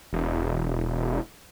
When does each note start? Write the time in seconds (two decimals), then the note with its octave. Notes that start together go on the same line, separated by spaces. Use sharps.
0.13 E1